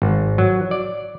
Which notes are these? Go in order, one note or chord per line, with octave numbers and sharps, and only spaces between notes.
G#1
F#3
D5